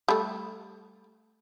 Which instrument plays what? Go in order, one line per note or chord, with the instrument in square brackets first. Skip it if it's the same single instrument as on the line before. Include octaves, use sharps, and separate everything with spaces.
[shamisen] G3 A3